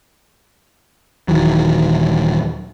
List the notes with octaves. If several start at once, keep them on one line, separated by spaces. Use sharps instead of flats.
D#1 D#3 E3 F#3